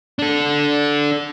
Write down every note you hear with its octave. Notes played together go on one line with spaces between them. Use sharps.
D4 A4